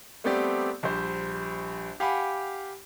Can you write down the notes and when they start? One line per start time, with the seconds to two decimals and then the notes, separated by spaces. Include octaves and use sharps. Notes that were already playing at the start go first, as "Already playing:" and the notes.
0.24 G3 A3 B3 C4 G4 D5
0.83 A#1 G3 C5
2.00 G4 F5 F#5 G#5 B5 D6